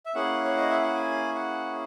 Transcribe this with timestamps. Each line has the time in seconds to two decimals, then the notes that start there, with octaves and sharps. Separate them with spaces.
0.06 E5
0.15 A#3 C#4 E4 G#4 F#5
0.44 C#5
0.57 D#5
0.69 E5
0.82 F#5
0.95 G#5
1.35 F#5